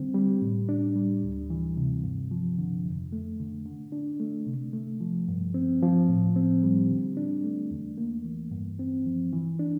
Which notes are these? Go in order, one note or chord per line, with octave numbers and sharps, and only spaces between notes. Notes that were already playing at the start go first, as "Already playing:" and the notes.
Already playing: D3 G3 C4
G3
A2
D4
G3
D2
E3
C3
G2
F3
D3
F2
A3
D3
D3
D4
A3
C3
A3
F3
G2
C4
F3
A2
C4
G3
D3
D4
A3
E2
A#3
E3
G2
C4
F3
E3
D4